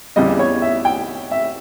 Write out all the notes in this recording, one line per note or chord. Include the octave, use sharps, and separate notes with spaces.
E2 C#3 G3 D#5
C#5
E5
G5
E5